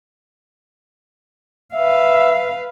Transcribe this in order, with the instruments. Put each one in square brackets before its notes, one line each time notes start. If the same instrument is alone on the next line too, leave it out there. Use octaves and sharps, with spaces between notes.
[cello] B4 F5 [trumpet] E5